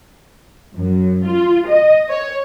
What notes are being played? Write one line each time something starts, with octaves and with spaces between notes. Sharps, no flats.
F#2
F4
D#5
C#5